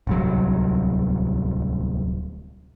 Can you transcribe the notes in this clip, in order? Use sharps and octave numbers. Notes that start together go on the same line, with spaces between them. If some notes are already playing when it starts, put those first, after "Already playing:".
D1 C2 F#3